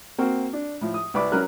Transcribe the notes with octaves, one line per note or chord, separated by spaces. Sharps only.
A#3 C4 F#4 A#4
D4
A2 F3
D#6
C2 B4 D5 B5 D6
F#3 C#4 A#4 F#6